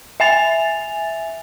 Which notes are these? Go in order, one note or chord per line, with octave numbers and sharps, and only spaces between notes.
E5 G#5 A6 F7